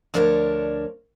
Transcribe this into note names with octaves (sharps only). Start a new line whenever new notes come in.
D2 F3 D4 A#4 B4 C#5